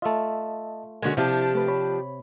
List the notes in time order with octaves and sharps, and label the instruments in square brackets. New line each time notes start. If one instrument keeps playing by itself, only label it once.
[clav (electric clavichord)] A3 F4 [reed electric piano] D#5 E5 A5
[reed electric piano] D3 A#4 [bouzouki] G#3 C#4 F#4
[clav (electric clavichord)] C3 [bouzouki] F3 D4 G4 [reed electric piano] E4
[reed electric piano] A3 B4
C#5 B5